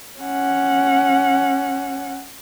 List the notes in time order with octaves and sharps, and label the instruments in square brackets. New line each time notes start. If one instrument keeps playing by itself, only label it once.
[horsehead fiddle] C#4 F#5